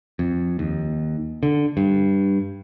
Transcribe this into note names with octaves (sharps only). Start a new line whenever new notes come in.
F2
D#2
D3
G2